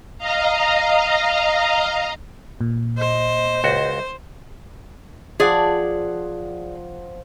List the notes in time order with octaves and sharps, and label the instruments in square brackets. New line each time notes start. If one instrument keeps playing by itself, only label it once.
[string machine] D#5 F5 A#5
[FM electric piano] A#2
[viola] C5 [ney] D#5
[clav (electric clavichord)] C#2 F#4 [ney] D#5
[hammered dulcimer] F3 F#5 G5 [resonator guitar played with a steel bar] G#4 D5